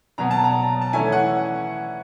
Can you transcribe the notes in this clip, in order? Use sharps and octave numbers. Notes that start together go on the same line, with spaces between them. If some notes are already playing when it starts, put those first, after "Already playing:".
B2 F#3 B3 A#5
A5
A#5
A5
E3 A3 C#4 E4 G#5
F#5